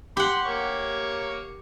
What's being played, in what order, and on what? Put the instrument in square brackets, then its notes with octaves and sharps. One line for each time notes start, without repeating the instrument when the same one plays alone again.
[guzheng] G4 F#5 [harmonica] C6
[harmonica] A#3 C#5 C#6